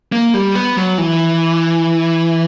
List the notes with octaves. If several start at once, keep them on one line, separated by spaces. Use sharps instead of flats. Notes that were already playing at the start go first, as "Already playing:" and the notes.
A#3
G3
B3
F#3
E3